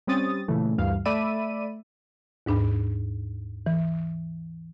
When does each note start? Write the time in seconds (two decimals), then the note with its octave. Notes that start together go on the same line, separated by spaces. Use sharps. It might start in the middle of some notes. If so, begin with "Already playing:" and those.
0.07 G3 C4 C#4 D#6 A6
0.48 A#2 C#3 E3 A3
0.78 D2 G2 E3 F5
1.05 A3 D5 E5 B5 D#7
2.46 D#2 G#2 D4 B5
3.66 E3